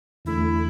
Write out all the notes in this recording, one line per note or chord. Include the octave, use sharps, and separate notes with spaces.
E2 D3 A3 E4